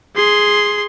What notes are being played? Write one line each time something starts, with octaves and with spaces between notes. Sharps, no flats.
G#4 C6